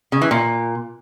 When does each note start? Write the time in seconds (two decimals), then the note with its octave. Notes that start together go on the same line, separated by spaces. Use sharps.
0.12 C#3
0.22 E3
0.31 A#2